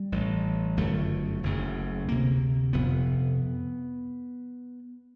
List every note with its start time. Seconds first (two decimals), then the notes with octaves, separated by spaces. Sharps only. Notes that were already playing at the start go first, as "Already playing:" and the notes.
Already playing: G3
0.12 A1 A2
0.77 G1 F#2 C#3 A3
1.43 F#1 F#2 C#3
2.08 D2 C3 A#3
2.73 F1 F2 C3 B3